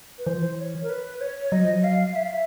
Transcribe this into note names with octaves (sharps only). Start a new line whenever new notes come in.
B4
E3 C5
F3
E3
C#5
A#4
B4
C#5
F#3 D#5
F3
F#3
F5
E5
F5
E5